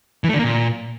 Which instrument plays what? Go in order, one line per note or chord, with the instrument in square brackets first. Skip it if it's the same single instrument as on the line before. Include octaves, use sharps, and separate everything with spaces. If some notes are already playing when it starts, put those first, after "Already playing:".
[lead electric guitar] E3
A3
D3
A#3
A#2